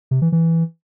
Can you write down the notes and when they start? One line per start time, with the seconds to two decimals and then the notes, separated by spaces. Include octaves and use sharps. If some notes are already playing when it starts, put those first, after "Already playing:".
0.11 C3
0.22 E3
0.32 E3